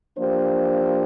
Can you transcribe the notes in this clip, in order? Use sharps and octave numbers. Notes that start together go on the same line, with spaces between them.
F3 A#3 D4 G4 C5